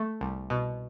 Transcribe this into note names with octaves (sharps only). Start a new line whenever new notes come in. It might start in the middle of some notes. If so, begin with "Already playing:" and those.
Already playing: A3
C2
B2